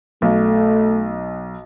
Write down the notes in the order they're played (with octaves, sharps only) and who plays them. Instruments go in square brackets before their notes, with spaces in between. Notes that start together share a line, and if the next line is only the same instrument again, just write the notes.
[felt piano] B1 [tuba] A3